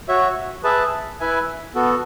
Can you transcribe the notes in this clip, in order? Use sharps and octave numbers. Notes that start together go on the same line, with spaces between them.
F#4 C#5 E5
G#4 B4 E5 A5
E4 B4 E5 G#5
B3 F#4 A4